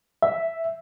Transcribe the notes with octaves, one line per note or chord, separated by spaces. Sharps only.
E5